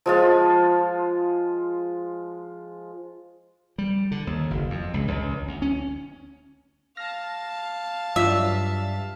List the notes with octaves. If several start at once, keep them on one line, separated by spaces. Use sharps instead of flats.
F3 G#3 F4
G3
D3
D#2
F#1
F2
C#2
C#2
D2
C#4
F5 A5 F6 A#6
G2 F#3 F4 D5 E5